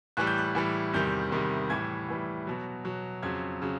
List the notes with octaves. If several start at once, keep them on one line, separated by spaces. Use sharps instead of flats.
A2 E3 G3 F#6
G6
F#6
A2 E3 G3
E2 C3 D#3 G3 G6
E2 C3 D#3 G3
A2 E3 G3 G#6
A2 E3 G3
B2 F#3
B2 F#3
F2 C#3 F#3 G#6
C#3 F#3